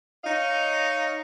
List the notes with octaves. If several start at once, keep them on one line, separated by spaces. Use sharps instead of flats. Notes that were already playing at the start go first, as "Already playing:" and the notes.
D#4 C#5 D#5 F5